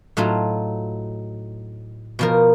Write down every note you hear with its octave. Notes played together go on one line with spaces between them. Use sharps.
A2 F#3 A3 D#4 F4
B2 F3 A#4